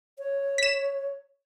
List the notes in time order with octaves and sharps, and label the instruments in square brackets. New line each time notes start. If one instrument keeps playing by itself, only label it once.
[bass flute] C#5
[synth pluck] B6 E7